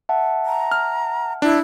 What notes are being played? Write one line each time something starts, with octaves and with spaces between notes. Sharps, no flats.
E5 F#5 A5
A#5
F6
D4 E4